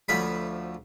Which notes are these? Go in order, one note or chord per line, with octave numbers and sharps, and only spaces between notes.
D2 F3 C#4 B5